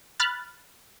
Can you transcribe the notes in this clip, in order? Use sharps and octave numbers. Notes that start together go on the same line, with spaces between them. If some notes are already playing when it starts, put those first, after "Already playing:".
B5 F6 F#6 A6